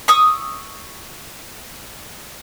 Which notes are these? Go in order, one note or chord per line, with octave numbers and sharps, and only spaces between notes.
C#6 D#6 E6